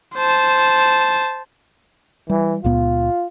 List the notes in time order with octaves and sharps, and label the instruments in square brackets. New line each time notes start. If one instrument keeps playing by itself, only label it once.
[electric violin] C5 A5
[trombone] E3 [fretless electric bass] G3
[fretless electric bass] C#2 A#2 B3 [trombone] F4